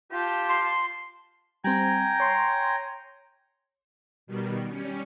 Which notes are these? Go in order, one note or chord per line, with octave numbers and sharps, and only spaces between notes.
F4 G4 A5
C6
G3 C4 G5 G#5 A#5
C#5 C6
B2 D#3 G3
G3 C#4